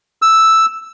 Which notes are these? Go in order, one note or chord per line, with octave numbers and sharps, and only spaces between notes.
E6